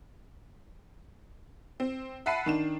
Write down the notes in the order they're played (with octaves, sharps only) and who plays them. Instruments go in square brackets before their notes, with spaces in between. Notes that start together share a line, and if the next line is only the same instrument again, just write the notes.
[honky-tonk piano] C4
E5 F#5 A5 B5 C7 D#7
D#3 D4 E7